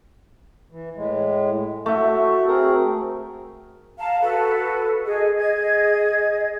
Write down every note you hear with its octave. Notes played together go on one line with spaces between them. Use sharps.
E3
A2 G#3
A3 F#4 E5
C4 G#4 A#4
F5 A5 A#5
F#4 A4 B4
G#4 D#5
G#4 D#5 G#6